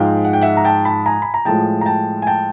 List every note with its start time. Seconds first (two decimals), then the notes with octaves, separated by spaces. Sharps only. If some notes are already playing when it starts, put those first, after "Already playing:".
Already playing: G#2 F3 G#3 F5 G5
0.25 F#5
0.33 G5
0.42 E5 F#5
0.57 A#5
0.65 G5 A5
0.85 A5 B5
1.06 G#5 A#5
1.22 B5
1.34 A#5
1.45 A2 F3 G#3 G5 A5
1.81 A#5
1.86 G5 A5
2.22 G#5
2.27 G5 A5